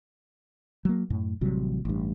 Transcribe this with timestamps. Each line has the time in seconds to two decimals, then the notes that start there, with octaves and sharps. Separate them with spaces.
0.85 F#3 A#3
1.10 F#2 A2
1.41 A1 C3 F#3 G3
1.85 A1 G2